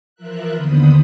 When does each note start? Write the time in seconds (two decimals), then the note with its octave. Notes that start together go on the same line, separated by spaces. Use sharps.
0.15 E3 F3 F4 A#4 E5 F#6
0.52 D#2 D3 B3 C5 B5 D#6